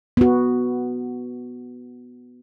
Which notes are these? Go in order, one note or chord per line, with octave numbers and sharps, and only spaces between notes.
B3 F#4